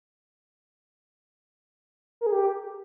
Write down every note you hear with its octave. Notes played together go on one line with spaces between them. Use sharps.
A#4
G#4
G4